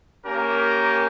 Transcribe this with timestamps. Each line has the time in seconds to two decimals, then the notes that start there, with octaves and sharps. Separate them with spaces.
0.24 A#3 C#4 G4 A#4